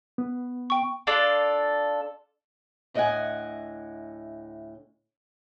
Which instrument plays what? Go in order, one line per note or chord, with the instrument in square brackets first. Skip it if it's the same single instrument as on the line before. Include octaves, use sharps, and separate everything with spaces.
[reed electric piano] B3
[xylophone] G5 C#6
[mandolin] D4 F4 A4 D5
[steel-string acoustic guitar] D2 A2 D#5 F5 F#5 G#5